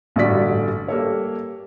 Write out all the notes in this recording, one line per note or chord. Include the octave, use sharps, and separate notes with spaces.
A1 G2 D3 F#4 D5 B6
G3 A#3 A4 C#5